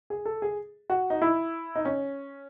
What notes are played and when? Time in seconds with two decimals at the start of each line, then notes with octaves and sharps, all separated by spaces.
0.10 G#4
0.25 A4
0.42 G#4
0.90 F#4
1.10 D#4
1.22 E4
1.76 D#4
1.85 C#4